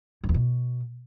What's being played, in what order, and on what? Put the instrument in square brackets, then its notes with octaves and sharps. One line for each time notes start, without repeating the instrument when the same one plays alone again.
[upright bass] F#2
E2
B2